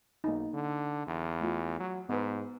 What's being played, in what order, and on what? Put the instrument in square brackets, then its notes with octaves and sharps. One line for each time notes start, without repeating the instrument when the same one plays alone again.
[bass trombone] B1 [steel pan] A#3 D#4
[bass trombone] D3
E2
[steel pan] A3 F4
[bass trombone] F#3
[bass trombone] G#2 [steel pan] B3 B4